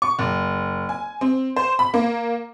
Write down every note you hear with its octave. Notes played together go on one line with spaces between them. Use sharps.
C#6
F#1
G#5
C4
C5
B5
A#3